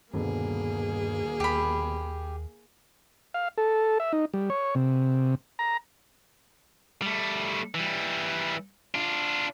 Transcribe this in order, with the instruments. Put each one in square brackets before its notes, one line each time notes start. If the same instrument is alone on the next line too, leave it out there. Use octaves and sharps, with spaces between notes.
[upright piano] D#1 B2 D3 [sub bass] G2 [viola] A#3 G#4
[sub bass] D#2 [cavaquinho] G4 B5
[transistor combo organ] F5
A4
E5
D#4
G3
C#5
C3
A#5
[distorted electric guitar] G3 A3
E3 G3
D4 F4